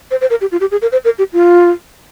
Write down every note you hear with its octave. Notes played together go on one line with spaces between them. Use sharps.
C5
C5
A#4
G4
F4
G4
G#4
A#4
C5
A#4
G4
F4